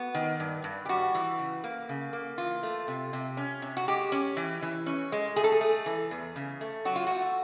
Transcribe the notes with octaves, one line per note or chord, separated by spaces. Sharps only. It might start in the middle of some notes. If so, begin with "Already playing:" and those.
Already playing: B3 F#4
D#3
G2
G2
G4
G3 F#4
E3
C#3
A#3
C#3
A#3
E3 F4
A3
C3
C3
C#4
C3
F#4
G#3 G4
C#4
E3
E3
C#4
G#3
A3 G#4
A4
G#4
A3
E3
E2
C#3
A3
F#3 F#4
F4
A3 F#4